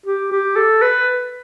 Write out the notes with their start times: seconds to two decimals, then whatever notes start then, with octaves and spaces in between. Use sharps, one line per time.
0.06 G4
0.32 G4
0.56 A4
0.82 B4